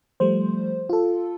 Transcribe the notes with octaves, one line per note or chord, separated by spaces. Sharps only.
F3 G3 A3 C5
F4 A4